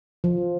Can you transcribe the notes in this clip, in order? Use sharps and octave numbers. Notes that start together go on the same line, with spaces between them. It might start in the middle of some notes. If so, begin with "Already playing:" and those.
F3